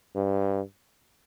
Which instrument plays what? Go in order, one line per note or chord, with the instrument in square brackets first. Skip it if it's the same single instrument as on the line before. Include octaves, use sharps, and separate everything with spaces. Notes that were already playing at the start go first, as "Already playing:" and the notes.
[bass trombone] G2